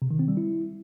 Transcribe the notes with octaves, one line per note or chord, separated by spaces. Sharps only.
C3
D#3
C4
G3
E4